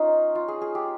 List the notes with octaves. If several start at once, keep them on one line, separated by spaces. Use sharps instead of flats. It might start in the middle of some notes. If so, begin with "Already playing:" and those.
Already playing: C#4 D#4 F4
F4
G#4
G#4
G4